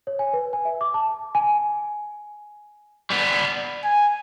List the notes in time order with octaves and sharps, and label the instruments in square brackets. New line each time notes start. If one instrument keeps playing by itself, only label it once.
[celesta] C#5
G#5
B4
G#5
E5
D6
A5
G#5
[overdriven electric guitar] G3 B3
[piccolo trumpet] G#5